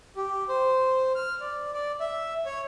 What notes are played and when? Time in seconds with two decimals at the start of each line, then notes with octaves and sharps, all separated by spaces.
0.16 G4
0.49 C5
1.15 F6
1.41 D5
1.74 D5
2.00 E5
2.46 C#5